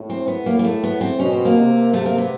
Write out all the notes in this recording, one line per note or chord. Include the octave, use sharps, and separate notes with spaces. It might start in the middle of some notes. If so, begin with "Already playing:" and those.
Already playing: A2
C4
B3
A2 A#3
A#3
A3
B3
C4
B2 C#4
C4
A#3
C3
A3
A#3
B3